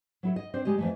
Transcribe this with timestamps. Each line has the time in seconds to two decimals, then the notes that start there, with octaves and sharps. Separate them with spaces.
0.23 F#3 E4 A4
0.36 D#5
0.54 C4 D4 C5
0.65 G3 G#3 G4 D#5
0.78 F2 E3 A3